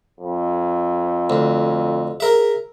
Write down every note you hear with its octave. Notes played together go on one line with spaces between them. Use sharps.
F2
D2
G#4 A#4 E5